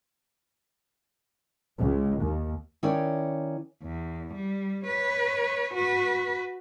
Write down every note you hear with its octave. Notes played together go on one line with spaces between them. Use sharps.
C#2
D#2
D#3 C#4 E4 C#5 D5
E2
G3
B4 C#5
F#4 B4